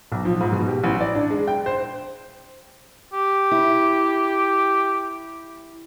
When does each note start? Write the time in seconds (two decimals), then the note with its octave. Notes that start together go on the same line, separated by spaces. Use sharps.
0.12 B1
0.25 F3
0.41 G#2
0.52 B2
0.68 G4
0.84 A1
1.01 D5
1.15 D4
1.30 G#3
1.48 G5
1.66 C5
3.13 G4
3.51 E4